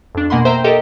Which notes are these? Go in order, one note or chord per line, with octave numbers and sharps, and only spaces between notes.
F2 D4
B2 A#3 F#5 G#5 B5 C6
C5 E5 G5 A#5
G4 A4 A#4 D#5 E5 G5